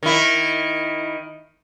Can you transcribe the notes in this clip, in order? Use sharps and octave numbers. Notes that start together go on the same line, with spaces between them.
D#3 E4